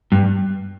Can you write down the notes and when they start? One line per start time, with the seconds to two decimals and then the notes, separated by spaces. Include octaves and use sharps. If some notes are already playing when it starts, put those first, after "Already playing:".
0.12 G2